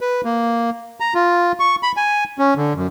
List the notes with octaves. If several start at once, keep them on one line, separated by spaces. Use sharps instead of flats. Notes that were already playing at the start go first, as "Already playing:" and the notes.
B4
A#3
A#5
F4
C#6
B5
G#5
C#4
D3
F#2